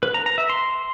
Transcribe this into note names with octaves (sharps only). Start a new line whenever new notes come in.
B4
A#5
A#5
E5
C6